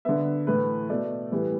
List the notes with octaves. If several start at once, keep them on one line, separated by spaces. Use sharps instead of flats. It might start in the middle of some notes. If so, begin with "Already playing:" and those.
D3 B3 E5
A2 E3 A3 B4
B2 A3 D5
A2 E3 G3 B3